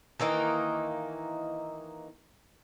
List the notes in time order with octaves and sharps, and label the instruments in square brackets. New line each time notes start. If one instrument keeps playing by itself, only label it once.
[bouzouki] D#3 E3 A#3 D#4